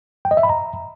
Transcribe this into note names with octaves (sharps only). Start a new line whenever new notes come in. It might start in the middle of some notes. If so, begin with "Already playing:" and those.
G5
D#5
E5
B5
A#5